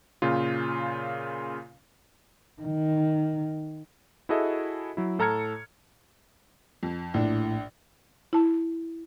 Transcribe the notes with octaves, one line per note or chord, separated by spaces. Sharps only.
A#2 C#3 F4
D#3
E4 F#4 G#4 A4 D#5 E5
F#3 E4
A2 A4 A#5 F6 G#6 C#7
F2
A#1 A2 D4
E4 A5